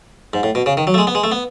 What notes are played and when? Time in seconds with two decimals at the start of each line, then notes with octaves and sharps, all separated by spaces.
0.33 G#2
0.43 A2
0.55 B2
0.66 C#3
0.77 D#3
0.87 F#3
0.94 A3
0.98 G#3
1.07 B3
1.15 G#3
1.24 A3
1.32 B3